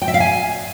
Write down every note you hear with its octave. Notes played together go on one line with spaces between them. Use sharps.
G5
E5
F5
G#5